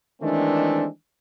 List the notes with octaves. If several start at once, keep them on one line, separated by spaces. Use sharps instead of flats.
D#3 E3 G#3 A3 C4 D4